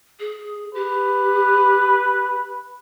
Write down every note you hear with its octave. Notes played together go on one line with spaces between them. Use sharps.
G#4
G4 B4